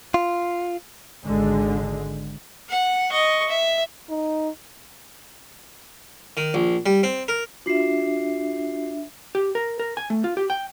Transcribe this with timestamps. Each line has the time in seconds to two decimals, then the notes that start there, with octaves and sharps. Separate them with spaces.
0.14 F4
1.24 G#1 D3 G#3
2.69 F#5
3.11 D#5 C#6
3.49 E5
4.10 D#4
6.37 D#3
6.54 A#1
6.86 G3
7.03 C4
7.28 A#4
7.66 D4 F4 F#4 E5 C7
9.35 G4
9.55 A#4
9.80 A#4
9.97 G#5
10.10 A3
10.24 F4
10.37 G4
10.50 G5